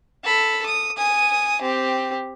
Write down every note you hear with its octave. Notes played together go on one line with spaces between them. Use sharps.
A4 B5
D#6
G#5 D#6
C4 G4